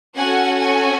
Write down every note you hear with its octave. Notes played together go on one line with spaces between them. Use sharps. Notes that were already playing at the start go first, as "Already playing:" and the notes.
C#4 F#4 A4 F#5 G#5
F#5 G#5